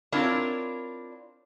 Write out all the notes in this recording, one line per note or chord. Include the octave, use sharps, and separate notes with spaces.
C4 D4 E4 F4 A#4 C#5